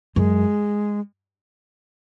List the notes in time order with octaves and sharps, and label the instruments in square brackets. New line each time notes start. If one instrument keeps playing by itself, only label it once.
[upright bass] F#2 [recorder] G#3